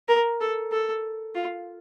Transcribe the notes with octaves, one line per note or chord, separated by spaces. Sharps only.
A#4
A4
A4
F4